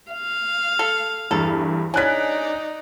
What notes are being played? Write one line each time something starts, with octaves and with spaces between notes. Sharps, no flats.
F5
A4
E2 G2 A4
C#3 D4 D#4 D5 G#5 F#6 B6